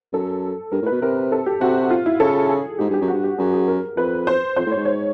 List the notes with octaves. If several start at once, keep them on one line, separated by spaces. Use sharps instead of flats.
F#2 A4
G2 A#4
A2
B4
B2
C3 A#4
A4
G4
C3 F#4
F4
E4
C#3 A4
G#4
G#2 G4
G2 G4
F#2
G2 F#4
G4
F#2 G#4
G#4
A#4
F2 B4
C5
F2 C5
A2
C#5
G#2
C#5